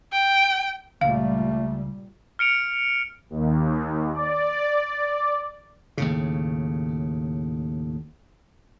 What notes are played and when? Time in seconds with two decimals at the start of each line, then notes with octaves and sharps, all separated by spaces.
0.12 G5
1.01 C#2 A#2 G3 A3 F5
2.39 F6 C#7 D7 F7
3.30 D#2
4.13 D5
5.97 D#2 A2 C#3